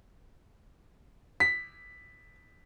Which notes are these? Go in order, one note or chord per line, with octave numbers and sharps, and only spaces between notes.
B6